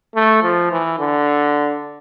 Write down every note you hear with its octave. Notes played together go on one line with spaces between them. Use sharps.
A3
F3
E3
D3